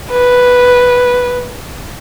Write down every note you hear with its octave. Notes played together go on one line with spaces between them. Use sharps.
B4